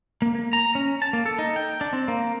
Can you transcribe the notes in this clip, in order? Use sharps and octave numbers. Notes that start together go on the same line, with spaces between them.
A#3
A#3
A#5
C#4
A5
A#3
A4
D#4
G5
D4
C4
A#3